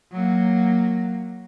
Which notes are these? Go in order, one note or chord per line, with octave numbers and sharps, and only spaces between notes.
F#3 A#3